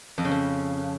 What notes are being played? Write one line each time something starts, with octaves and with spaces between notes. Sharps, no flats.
F2
C#3
F2